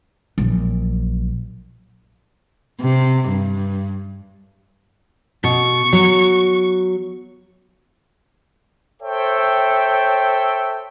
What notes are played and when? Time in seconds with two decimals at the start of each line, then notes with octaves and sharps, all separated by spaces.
0.38 A#1 F#3
2.81 C3
3.29 G2
5.44 B2 C#6
5.93 F#3
9.03 A4 C5 C#5 E5 G5